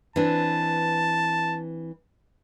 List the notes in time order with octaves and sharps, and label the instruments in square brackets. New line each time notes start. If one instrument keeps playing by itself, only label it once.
[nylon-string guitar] E3 C4 D4 [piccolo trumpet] A5